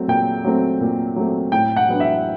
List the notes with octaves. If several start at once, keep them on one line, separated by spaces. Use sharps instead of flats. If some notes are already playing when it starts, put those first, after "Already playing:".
Already playing: F#3 A3 C4
A#2 G5
F#3 A3 C4
A#2
F#3 A3 C4
A2 G5
F#5
F#3 B3 D4
E5